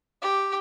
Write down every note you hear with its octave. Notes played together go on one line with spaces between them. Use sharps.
G4